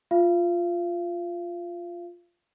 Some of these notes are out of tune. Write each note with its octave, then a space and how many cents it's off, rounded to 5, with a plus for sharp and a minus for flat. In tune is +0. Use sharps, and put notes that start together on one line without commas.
F4 +0 F5 -35